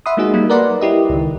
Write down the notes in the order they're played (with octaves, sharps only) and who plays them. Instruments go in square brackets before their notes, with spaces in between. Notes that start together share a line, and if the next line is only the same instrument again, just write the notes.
[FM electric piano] E5 F#5 B5 C6 D#6
G#3 A#3 D#4 F#4 G#4 D#5
F#3 G3 A#3 D#4
A#4 B4 D5 F#5 A#5 C6
E4 G4 D#5
C#2 D#3